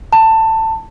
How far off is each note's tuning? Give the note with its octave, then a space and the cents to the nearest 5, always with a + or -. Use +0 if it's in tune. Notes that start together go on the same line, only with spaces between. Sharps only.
A5 +20